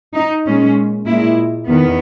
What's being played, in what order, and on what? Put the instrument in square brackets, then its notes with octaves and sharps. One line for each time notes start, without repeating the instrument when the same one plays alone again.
[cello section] D#4
A#2 G#3 C#4
A#2 G#3 E4
E2 D#3 B3